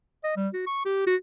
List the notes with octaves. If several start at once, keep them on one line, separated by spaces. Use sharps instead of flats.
D#5
G3
F#4
C#6
G4
F#4